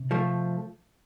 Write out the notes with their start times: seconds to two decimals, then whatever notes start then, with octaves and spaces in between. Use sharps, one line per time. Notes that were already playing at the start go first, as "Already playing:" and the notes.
Already playing: C3
0.11 F3 A3